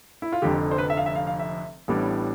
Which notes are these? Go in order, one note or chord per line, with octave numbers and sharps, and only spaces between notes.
E4
F4
F1 F2 D3 G4
C5
B4
E5
F5
E5
F5
F5
E5
A1 A2 G3 B3 D4